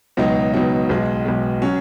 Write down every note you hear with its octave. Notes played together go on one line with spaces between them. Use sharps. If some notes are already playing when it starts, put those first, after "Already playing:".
C#2 B2 F#3 D#4
C#2 B2 F#3 D#4
B1 B2 G#3
B1 B2 G#3
F#3 C#4